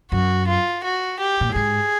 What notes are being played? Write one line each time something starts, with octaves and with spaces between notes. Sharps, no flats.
F#2 F#4
F4
F#4
G4
A#2
A2
G#2 G#4